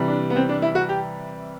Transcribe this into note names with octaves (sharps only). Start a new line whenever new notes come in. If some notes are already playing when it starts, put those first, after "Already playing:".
Already playing: C3 E3 G3
D4
B3
C4
D4
E4
F#4
G4